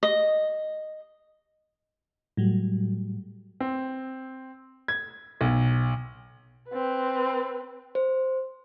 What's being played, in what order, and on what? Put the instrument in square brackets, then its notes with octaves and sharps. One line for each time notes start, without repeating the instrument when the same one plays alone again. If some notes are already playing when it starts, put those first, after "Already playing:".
[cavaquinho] D#5
[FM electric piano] A2 F#3 G3
[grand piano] C4
G#6
B1
[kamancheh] C4 B4
[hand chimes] C5